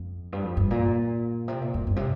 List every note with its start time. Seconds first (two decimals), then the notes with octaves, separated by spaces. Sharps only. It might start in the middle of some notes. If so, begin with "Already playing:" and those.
Already playing: F2
0.32 G2
0.44 F2
0.57 G2
0.71 A#2
1.48 C3
1.61 A#2
1.74 F2
1.87 G2
1.96 C3